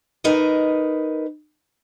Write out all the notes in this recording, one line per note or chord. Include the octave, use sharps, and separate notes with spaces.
D#4 A#4 B4 D#5